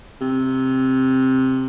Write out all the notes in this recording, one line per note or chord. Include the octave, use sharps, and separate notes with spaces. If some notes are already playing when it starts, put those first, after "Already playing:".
C3